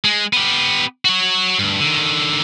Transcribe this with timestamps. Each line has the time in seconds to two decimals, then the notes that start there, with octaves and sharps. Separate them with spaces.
0.05 G#3
0.33 B3 G4
1.05 F#4 C#5
1.59 D2 G2
1.80 D3 D#3